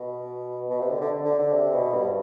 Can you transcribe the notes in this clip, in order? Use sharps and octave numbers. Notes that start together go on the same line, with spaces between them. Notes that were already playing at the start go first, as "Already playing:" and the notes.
Already playing: B2
B2
C3
D3
D3
D3
D3
C3
B2
G2